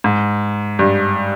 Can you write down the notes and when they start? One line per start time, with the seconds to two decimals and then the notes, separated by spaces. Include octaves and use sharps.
0.04 G#2
0.79 G2